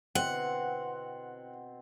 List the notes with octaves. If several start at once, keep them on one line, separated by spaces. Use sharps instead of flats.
B2 D3 C4 E4 F#5